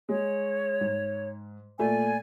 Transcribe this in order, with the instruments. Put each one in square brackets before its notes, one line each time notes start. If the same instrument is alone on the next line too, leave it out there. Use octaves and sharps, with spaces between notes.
[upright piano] G#3 [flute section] C#5
[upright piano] G#2
[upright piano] A#2 A3 [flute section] D5 G#5